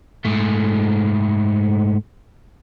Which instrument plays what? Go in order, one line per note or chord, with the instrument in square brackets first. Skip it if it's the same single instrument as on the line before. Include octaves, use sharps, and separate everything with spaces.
[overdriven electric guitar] G#2 A3